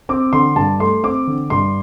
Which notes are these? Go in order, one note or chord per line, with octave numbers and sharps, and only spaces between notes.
C4 D6
D3 C6
G2 A5
A3 C6
C4 D6
D3
G2 C6